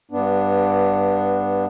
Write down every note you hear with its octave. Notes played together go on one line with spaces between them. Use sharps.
G2 B3 D4